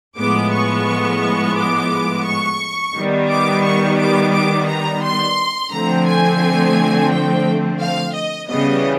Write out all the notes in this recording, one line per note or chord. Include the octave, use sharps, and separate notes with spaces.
A2 F3 G#3 B3 D6
C#6
D6
C#6
D#3 G3 B3
D6
C#6
D6
D6
A#5
C6
D3 F3 A3 C4 A#5
G#5
G5
F5
D#5
C#3 E3 G3 B3 D#5